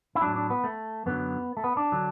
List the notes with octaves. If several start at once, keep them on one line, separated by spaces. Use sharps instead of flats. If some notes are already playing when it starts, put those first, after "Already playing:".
E4
A2 F#3 D4
D4
B3
A3
F#2 D3 F#3 B3
A3
B3
D4
D3 F#3